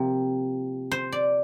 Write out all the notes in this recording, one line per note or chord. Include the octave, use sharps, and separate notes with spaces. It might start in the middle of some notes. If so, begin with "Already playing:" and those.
Already playing: C3 F3 A#3
C5
D5